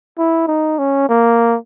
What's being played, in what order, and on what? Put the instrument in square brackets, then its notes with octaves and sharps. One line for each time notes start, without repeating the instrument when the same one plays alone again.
[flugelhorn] E4
D#4
C#4
A#3